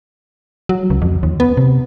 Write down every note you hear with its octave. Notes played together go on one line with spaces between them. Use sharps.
F#3
C#2
F2
D#2
B3
C3